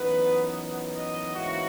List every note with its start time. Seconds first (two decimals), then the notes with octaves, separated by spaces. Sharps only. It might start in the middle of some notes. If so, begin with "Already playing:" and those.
Already playing: F#2 E3 B3 D#4 B4
0.94 D#5
1.35 G#2 E3 A#3 C#4 E4 F#4